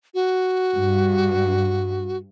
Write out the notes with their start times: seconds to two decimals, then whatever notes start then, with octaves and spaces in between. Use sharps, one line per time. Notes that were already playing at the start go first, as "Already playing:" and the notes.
0.14 F#4
0.76 G2